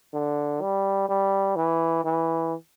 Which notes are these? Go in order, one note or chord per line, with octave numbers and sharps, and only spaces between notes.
D3
G3
G3
E3
E3